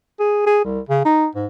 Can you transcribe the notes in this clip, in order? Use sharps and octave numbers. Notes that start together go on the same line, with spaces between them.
G#4
G#4
C2
C#3
D#4
G#2